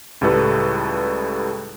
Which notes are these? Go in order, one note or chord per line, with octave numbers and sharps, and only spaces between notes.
C#2 A2 G3 A4 B4